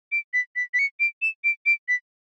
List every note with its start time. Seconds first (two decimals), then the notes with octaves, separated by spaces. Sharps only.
0.12 D7
0.34 B6
0.56 B6
0.74 B6
0.79 C#7
1.00 D7
1.22 E7
1.44 D7
1.66 D7
1.88 B6